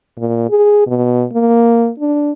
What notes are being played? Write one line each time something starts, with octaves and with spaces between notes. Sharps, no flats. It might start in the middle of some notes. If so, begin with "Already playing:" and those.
A#2
G#4
B2
A#3
D4